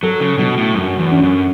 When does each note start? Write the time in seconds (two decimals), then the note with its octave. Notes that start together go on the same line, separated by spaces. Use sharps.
0.03 F#3 A4
0.20 C#3
0.38 B2 F#3
0.57 A2
0.75 F#2 F#3
0.99 E2
1.11 C#4
1.23 F#2